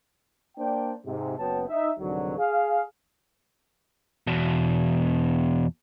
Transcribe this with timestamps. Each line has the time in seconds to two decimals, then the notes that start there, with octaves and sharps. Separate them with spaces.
0.58 A#3 D4 C5 D5 G5
1.06 G#2 C3
1.38 F#1 F#3 B3 C#5 G5 A5
1.68 D#4 E5
1.99 C2 G#2 D3 D#3 F#3
2.38 G#4 F5
4.27 E2 B2